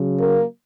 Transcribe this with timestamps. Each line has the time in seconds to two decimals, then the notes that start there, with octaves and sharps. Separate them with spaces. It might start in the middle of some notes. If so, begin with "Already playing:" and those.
Already playing: C#3 F#3
0.18 A#3